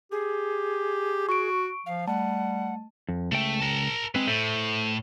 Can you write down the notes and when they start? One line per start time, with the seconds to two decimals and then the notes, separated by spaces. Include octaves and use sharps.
0.11 G4 G#4
1.29 F#4 C#6 D7
1.86 F3 F5
2.07 G3 A3 F#5 A5
3.09 F2
3.32 C#2 A3 G5
3.60 A#4 A5
4.15 G#3 C4 B4
4.27 A2 A4 C5 E5